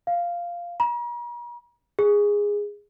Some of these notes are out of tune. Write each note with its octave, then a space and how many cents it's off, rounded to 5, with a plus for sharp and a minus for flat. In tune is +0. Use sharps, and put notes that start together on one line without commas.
F5 -5
A#5 +45
G#4 -15